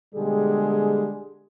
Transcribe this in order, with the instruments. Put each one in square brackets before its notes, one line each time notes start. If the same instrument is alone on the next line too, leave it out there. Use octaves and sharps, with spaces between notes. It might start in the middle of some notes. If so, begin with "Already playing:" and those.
[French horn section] B2 D3 G3 G#3 G4 G#4